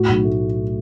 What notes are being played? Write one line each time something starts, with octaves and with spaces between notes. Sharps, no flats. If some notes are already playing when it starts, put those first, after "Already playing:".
Already playing: A2 F#4
B1
A3